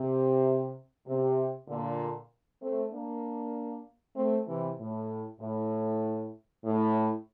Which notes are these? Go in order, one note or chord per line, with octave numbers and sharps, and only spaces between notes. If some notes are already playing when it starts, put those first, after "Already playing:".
Already playing: C3
C3
A#2 D3
A3 C4
A#3 D4
A3 C4
C3 E3
A2
A2
A2